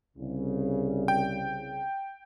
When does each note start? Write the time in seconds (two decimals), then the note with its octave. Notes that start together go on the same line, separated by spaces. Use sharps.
0.17 C2 C#3
1.08 G5